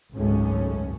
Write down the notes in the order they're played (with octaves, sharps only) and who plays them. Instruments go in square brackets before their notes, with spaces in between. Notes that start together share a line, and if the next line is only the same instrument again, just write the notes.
[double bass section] G#1 C#2 F#2 G#3 A3 C#4